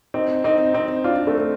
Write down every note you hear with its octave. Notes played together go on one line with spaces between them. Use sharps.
C4 D#4
C4 D#4
C4 D#4
D4 F4
A3 C4